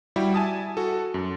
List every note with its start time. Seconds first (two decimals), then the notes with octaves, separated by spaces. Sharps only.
0.16 G3 E4 F#4 G4
0.34 E5 G#5 A5 D#6
0.77 F#4 A4
1.14 F#2